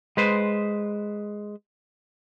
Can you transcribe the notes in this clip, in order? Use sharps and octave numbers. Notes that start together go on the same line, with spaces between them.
G#3 B4 C5